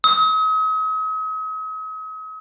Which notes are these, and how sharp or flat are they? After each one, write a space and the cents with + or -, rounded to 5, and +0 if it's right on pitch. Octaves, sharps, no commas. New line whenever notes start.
D#6 +40